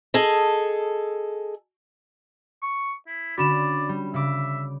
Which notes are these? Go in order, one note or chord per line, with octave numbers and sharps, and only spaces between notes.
G#4 A4 D#5
C#6
E4
D3 C#4 F#4 D5 B5 E7
G3
C#3 E5 D6